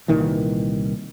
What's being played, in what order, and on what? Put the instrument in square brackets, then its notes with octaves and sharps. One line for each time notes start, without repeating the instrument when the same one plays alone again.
[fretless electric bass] C2 A#2 D#3 E3